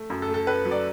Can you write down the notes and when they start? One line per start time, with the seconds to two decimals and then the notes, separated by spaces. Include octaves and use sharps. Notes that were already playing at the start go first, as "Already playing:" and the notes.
Already playing: A3
0.10 F#2
0.22 A4
0.28 A3
0.34 A4
0.47 A3 B4
0.65 F#3
0.71 D5